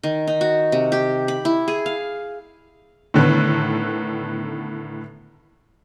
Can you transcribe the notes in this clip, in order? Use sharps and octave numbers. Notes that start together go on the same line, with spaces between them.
D#3
D#4
F#4
C3
G4
B5
E4
G#4
F5
A2 D3 D#3 B3